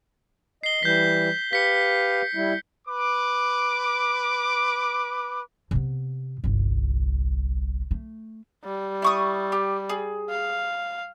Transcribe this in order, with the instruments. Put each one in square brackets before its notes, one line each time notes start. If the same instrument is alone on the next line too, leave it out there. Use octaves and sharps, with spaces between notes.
[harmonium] D#5 [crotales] C7 G7
[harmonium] E3 G3 [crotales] G6 B6
[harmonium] G4 B4 F5 [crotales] B6 C#7
[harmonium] G3 E4
[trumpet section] B4 D6
[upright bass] C3 B3
G1 C2
A3
[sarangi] G3
[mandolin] E4 C#6 D#6
G4
G#4
[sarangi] F5